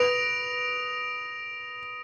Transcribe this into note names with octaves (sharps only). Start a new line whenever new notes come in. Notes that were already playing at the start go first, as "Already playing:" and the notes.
Already playing: B4 D#6 A#6 D7 F7